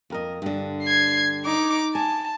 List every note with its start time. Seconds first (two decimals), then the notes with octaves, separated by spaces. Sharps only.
0.10 F2 A#4 D#5
0.42 G2 D3
0.83 G#6 C7
1.45 D#4 D6
1.95 G#5 A5